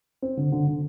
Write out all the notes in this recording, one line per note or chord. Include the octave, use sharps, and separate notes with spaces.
C4
D3
D3
D3